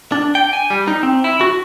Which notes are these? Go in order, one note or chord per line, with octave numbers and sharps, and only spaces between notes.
D4
G5
G#5
G3
D#4
C4
E4
F#4